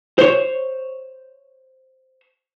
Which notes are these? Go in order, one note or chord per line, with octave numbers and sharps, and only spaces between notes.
C5 C#5